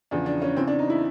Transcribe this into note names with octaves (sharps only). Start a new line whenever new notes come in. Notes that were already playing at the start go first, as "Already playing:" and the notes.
E2 C#3 F3 D4
D4
C#4
E2 C#3 E3 C4
D4
D#4
E4